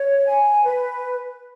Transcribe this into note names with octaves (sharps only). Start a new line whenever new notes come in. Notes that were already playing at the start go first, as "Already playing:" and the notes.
Already playing: C#5
G#5
B4